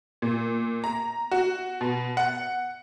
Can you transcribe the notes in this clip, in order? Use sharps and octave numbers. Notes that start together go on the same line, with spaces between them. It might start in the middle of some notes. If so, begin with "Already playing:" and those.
A#2
A#5
F#4
B2
F#5